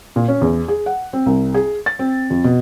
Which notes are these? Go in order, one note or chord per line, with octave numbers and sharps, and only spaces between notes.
A#2
C#4
E2
G#4
F#5
C4
C2
G#4
A6
C4
F2
B2